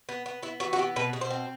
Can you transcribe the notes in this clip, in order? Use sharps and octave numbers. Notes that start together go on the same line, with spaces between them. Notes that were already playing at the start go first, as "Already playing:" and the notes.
B3
B3
B3 E4
E3 F#4
F#4
B3 G4
B2 B4
B2
C5
C4